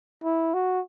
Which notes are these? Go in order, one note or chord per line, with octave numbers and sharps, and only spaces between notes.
E4
F#4